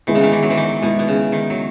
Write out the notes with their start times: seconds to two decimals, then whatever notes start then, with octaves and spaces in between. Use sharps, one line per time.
0.07 D#3 G#3 B3 E4
0.15 C#3
0.23 D#3
0.32 E3
0.43 F#3
0.50 E3
0.57 D#3
0.82 B2 G#3 B3 E4
0.99 B2
1.08 C#3
1.32 D#3
1.50 F#3